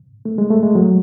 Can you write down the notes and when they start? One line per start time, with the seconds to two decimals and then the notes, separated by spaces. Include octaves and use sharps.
0.25 A3
0.38 G#3
0.50 A3
0.63 G#3
0.75 F#3